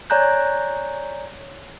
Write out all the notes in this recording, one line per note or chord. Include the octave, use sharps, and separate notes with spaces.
C#5 D5 G#5 A#5 F#6 G6